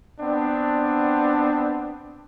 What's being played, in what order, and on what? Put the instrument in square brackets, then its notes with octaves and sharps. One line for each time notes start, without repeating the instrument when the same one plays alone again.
[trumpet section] B3 C4 D4